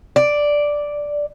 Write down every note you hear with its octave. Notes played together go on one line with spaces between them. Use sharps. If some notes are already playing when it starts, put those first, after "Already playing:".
D5